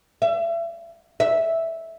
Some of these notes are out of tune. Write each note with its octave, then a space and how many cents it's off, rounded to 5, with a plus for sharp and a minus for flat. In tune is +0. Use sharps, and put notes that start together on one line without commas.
E5 +35
E5 -5